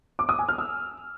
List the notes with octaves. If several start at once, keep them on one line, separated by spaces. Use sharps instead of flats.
D6
D#6
G#5
F6
E6